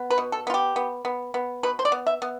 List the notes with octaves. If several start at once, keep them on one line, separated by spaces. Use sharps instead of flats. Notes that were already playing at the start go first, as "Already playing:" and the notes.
Already playing: B3
B4
B2
A4
B3 F4
G4
B3
B3
B3
B2 B4
C5
D5
B3
E5
B3